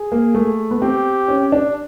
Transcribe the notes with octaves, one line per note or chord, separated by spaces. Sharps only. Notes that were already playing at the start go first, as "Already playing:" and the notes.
Already playing: G#4
A#3
A3
B3
C4 G4
C#4
D4